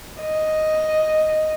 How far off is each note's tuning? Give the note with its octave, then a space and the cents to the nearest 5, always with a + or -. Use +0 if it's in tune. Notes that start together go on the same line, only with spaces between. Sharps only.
D#5 +0